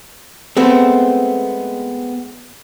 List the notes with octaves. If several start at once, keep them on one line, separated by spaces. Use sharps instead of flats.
G#3 A3 B3 C4